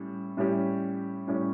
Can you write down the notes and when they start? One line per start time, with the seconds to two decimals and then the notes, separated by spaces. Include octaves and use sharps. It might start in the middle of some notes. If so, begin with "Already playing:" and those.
Already playing: A2 G3 C#4
0.37 A2 G3 C#4 G4
1.27 A2 G3 C#4 G4